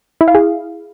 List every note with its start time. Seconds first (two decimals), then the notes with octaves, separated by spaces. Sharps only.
0.21 E4
0.28 F5
0.35 G#4